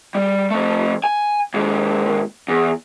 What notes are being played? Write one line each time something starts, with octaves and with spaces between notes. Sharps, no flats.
G3
F3 A3
G#5
D#2 G#2
E2